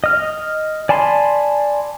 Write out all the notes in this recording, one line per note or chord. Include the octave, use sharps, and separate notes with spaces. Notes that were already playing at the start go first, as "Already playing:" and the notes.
D#5 F6
D5 G#5 A5 B5 C6